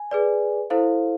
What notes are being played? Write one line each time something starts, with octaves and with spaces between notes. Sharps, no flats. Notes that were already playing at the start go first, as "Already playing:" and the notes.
Already playing: G#5
G#4 B4 D5
E4 A4 C5 F5